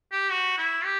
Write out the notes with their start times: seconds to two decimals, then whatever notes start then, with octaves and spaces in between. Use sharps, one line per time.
0.12 G4
0.30 F#4
0.58 E4
0.85 G4